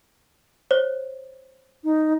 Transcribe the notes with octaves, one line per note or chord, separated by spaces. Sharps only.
C5 C#5
D#4